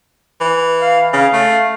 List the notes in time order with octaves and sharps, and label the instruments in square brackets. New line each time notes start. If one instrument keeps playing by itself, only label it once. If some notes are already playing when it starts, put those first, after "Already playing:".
[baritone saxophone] E3
[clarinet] F5
[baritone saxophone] C#3 [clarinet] F5
[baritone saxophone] A3